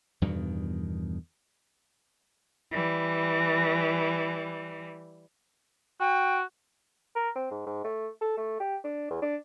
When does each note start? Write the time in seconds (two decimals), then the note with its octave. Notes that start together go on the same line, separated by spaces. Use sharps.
0.22 E2 G2 B2 D#3
2.69 E3 G3
6.00 F#4 G5
7.16 A#4
7.36 C4
7.51 G#2
7.67 G#2
7.84 A3
8.21 A4
8.37 A3
8.60 G4
8.84 D4
9.10 E2
9.22 D4